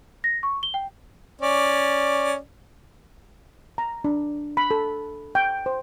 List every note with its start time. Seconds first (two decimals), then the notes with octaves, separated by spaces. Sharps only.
0.24 A#6
0.43 C#6
0.63 G7
0.74 G5
1.42 C#4 D5
3.78 A#5
4.04 D4
4.57 B5
4.71 A4
5.35 G5
5.66 C5